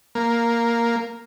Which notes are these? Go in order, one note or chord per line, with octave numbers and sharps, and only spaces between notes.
A#3